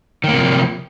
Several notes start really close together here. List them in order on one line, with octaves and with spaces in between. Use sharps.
D#3 A#3 C3 F3